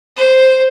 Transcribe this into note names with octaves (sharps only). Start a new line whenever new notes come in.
C5